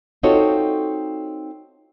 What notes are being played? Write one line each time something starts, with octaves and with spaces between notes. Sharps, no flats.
C4 D#4 F4 F#4 A4 C#5